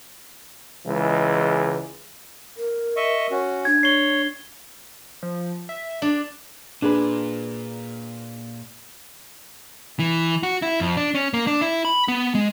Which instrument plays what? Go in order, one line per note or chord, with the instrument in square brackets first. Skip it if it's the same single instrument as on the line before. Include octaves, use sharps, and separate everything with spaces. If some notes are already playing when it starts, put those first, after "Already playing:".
[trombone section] C#2 E3 G#3
[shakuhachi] A#4
[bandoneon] D#5 E5 C#6
C#4 F#4
[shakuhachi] D4 [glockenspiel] G#6
[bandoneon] C#5 [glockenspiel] C7 G7
[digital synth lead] F3
E5
[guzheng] D4 [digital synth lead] D5
[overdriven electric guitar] A#2 [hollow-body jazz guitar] D4 G#4 B4
[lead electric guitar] E3
F#4
E4
F2
D4
C#4
A#3
D4
E4
B5
B3
G#3